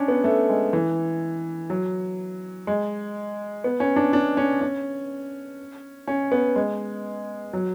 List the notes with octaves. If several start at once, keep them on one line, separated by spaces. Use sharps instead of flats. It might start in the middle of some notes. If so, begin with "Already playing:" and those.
Already playing: C#4 D4
B3
A3
G#3
E3
F#3
G#3
B3
C#4
D4
D4
C#4
C#4
C#4
B3
G#3
F#3